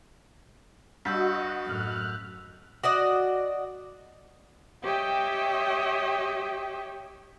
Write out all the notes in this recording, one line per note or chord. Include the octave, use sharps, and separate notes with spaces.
G2 F#4 D#5 E6 G6 B6
F#2 A2 F6 F#6
F#4 D5 D#5
G4 C#5 D#5 E5 G5